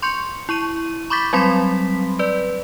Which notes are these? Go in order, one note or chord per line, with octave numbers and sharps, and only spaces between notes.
C6 C#6 G6 C#7
E4 C#6 D#7
B5 C#6 D6 G6 A6 B6
F#3 G3 C4 B5 C6 B6
B4 D5